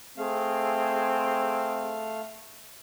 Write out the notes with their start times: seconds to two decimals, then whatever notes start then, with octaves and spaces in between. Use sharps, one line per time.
0.18 A3 C4 G#4 F5